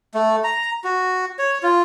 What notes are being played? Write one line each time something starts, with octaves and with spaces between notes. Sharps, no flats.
A3
A#5
F#4
C#5
F4